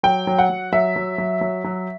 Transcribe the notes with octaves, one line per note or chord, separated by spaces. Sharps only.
F#3 G5
F#3
F#5
F#3
F#3 E5
F#3
F#3
F#3
F#3